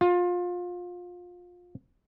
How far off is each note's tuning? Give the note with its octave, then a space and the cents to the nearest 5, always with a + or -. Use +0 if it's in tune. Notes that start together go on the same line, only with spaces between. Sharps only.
F4 +25